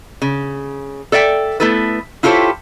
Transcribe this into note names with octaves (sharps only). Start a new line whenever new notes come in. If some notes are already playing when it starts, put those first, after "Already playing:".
C#3
A4 D5 E5 G5
A3 B3 E4 A4 B4
E4 F4 G4 A4 C5 C#5